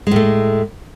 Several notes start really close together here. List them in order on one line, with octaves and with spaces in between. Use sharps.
G#3 A2 A3